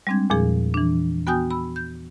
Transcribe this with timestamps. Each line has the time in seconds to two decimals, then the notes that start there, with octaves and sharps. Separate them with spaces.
0.07 G3 G#3 C4 D4 G#6
0.30 E2 A#2 F3 G#4
0.74 E3 D4
1.27 B3 F#4 G5 G#5 D#6 G6
1.51 B5 E6
1.76 G6